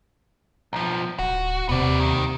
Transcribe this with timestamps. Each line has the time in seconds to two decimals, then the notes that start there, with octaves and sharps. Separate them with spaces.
0.73 B1 F3
1.19 D1 F#4
1.69 D#2 C3 B3 D5
2.00 G2 D#3